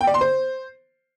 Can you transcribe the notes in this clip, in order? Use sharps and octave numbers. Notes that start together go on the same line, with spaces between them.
G5
D5
C6
C5